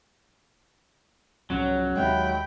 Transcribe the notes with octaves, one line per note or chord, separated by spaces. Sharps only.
C2 G#2 F3 F#3 C#4
D#2 G#3 E5 F5 G5 B5